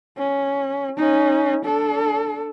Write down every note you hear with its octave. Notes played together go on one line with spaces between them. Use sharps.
C#4
C#4 D#4
D4 A4